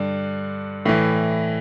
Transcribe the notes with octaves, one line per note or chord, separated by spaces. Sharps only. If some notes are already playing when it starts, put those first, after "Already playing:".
Already playing: G2 D3 D5
A2 E3